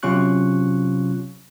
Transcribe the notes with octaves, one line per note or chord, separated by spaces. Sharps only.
C3 F#3 C#4 F4 C#6 F#6